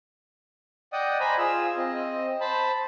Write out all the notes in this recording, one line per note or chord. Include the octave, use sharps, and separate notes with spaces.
D5 D#5 F#5 G5 D#6
C5 G#5 A#5 B5
F4 G#4 E6
C4 D#5
C5 A5 B5